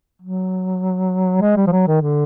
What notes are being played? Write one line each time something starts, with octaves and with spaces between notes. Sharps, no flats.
F#3
G#3
G3
F3
F#3
D#3
D3